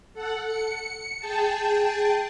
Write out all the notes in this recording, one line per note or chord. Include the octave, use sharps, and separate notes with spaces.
A4 F#5
C#7
G#4 G5 A5